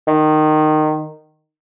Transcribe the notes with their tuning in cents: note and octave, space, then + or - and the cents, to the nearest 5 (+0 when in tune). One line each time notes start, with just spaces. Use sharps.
D#3 -15